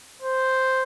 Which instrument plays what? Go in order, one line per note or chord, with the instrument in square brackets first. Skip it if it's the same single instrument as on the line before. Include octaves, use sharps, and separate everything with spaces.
[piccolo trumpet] C5